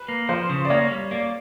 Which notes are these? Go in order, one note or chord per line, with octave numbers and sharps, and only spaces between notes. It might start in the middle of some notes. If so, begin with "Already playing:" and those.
Already playing: B4
A#3
F3 C5
C#3
D5
A#3 C#5
G3
A#3 D5